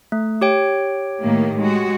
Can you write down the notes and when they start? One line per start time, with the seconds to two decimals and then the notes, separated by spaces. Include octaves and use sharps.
0.12 A3
0.41 G4 C#5 G5
1.21 A2 D#3 A#3
1.58 G#3 F#4